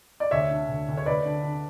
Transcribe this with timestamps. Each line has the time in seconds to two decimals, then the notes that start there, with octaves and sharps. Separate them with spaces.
0.20 D5
0.31 D2 C#5 E5
0.51 D3
0.69 D2
0.88 D2
0.97 C#5
1.06 D2 B4 D5
1.25 D3
1.43 D3